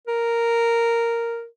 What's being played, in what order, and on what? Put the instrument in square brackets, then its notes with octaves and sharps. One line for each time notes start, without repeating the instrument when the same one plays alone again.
[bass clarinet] A#4